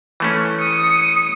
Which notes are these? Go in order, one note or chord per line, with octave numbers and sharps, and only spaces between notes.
E3 A3 C#4
D#6 C#7